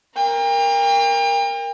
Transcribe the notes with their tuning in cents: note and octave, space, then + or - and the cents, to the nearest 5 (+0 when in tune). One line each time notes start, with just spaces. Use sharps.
A#4 +0 G5 +40